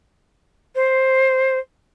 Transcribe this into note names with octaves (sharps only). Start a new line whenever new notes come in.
C5